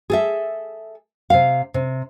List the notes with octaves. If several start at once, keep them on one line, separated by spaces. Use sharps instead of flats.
G#4 A4 E5
C3 F5
C3